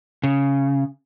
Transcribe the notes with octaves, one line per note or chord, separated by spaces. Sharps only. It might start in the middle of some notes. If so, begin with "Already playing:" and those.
C#3